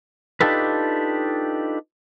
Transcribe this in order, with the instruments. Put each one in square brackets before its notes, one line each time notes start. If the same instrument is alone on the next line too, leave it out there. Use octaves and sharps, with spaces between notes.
[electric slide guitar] D4 D#4 F4 G4 A4 B4